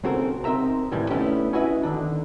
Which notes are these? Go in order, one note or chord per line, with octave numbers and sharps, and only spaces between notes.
B1 C#3 C4 F#4 A4 A#4
C4 D4 D#4 A#4 E5 A#5
C2 A2 C3 D#3 E3 G3
A3 B3 C#4 D4 E4 G4
C#4 E4 F#4 B4 D#5 E5
D3 D#3 D4